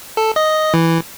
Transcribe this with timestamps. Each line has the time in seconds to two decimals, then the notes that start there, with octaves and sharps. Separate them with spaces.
0.17 A4
0.36 D#5
0.74 E3